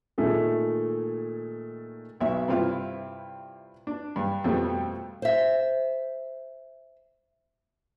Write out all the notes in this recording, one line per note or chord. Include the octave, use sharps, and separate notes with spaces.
A#2 D#3 A3 G#4 A4
B1 B2 E5
G2 C3 C4 E4 F4
D4
G2
F2 B2 G3 A3 C4
C5 E5